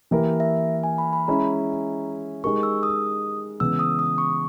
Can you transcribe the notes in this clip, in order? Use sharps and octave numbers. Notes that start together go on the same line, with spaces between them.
E3 A#3 E4 G4 A#4 G5
E5
G#5
B5
B5
G#3 C#4 E4 A#5
G#3 D#4 G4 A#4 C#6
E6
D#6
C#3 E3 G#3 B3 E6
D#6
D#6
C#6